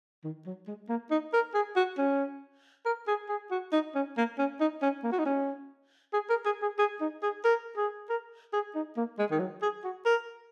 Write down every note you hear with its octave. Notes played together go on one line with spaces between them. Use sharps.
D#3
F#3
G#3
A#3
D#4
A#4
G#4
F#4
C#4
A#4
G#4
G#4
F#4
D#4
C#4
A#3
C#4
D#4
C#4
A#3
F#4
D#4
C#4
G#4
A#4
G#4
G#4
G#4
D#4
G#4
A#4
G#4
A#4
G#4
D#4
A#3
G#3
D#3
F#3
G#4
F#4
A#4